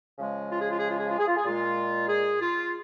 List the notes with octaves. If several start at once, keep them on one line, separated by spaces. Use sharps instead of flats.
C#3 F3 G#3
F4
G#4
F4
G#4
F4
G#4
F4
G#4
F4
G#4
A#2 G#3 F4
G#4
F4